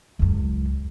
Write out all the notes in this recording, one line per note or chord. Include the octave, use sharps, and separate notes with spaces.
C#2 F#2